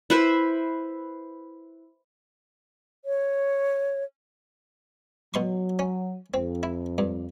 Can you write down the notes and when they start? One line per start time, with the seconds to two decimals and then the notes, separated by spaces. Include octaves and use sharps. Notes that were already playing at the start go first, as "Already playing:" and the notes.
0.10 E4 B4 C5
3.05 C#5
5.34 B2 F#3 C6 C#6
5.79 C#4
6.34 F2 C4
6.63 E4
6.98 G2